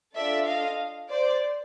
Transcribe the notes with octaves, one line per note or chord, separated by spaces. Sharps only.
D4 F4 A4 D5 E5
D#5 F5
C5 D5